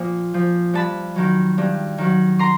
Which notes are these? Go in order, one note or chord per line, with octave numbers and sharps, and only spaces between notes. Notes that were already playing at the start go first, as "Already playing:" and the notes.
Already playing: A#2 F3
F3
G2 A5 B5
D#3 F#3
G2
D#3 F#3
A#5 C6